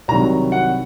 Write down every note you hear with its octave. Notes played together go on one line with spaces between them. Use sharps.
C2 C3 D#3 F#3 A#5
F#5